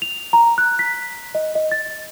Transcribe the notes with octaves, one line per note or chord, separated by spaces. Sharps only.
F7
A#5
F#6
B6
D#5
D#5
A6